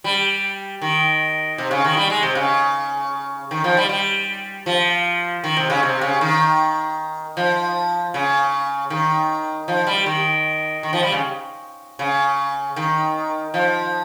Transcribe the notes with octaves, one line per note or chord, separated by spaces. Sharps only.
G3
D#3
C3
C#3
D#3
G3
G#3
C3
C#3
D#3
F3
G3
G3
F3
D#3
C3
C#3
C3
C#3
D#3
F3
C#3
D#3
F3
G3
D#3
D#3
F3
G3
C#3
C#3
D#3
F3